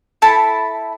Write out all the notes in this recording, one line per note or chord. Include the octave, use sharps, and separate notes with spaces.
E4 A4 A5 B5